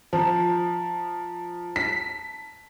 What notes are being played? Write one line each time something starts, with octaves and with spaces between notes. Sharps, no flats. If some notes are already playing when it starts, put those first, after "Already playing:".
F3 A5 A#5
B6